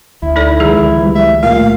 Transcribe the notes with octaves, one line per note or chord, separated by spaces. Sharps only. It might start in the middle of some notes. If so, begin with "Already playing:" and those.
D2 E4
D#4 A4 D5
C#2 D3 D#3 F3 G#3 G#4
E3 G3
G3 E5
A#2 A3 F5